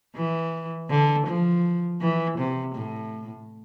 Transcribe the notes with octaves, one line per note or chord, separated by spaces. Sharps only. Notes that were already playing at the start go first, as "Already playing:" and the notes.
E3
D3
F3
E3
C3
A2